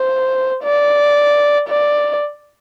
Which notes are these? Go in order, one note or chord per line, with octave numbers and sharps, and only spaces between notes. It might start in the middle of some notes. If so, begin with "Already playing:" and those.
Already playing: C5
D5
D5